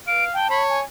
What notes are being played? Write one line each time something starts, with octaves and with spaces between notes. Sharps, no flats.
B4 F5 D7
G5 A5
C#5 B5
G#5